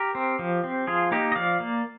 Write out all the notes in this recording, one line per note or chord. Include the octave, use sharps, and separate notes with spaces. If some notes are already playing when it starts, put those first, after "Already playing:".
Already playing: G4 A#4
C4
F3
C4
F3 F4 G#4
A#3 D#4 G4
D#5
F3 D5 F5
A#3